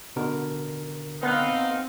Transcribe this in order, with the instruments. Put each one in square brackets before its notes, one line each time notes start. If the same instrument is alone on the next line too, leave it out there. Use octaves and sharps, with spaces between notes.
[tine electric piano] B2 D3 A#4
[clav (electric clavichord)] B3 [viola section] C4 [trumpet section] D#4 F5